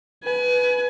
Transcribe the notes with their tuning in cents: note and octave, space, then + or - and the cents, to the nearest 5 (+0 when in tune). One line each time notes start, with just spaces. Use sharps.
B4 +0 G#5 +35